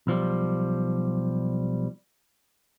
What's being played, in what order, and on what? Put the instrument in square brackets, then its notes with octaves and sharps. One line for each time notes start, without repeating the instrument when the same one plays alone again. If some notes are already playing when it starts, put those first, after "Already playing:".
[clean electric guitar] B1 F3 G3